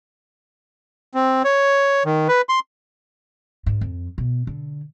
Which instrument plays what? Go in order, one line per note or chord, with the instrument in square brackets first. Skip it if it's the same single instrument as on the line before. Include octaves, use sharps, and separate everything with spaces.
[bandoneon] C4
C#5
D#3
B4
C6
[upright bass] G#2
F2
B2
D3